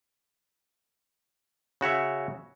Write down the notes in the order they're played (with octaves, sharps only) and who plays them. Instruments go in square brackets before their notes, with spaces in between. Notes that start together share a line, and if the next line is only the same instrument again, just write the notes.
[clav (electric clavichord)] C#3 F#4 C#5 E5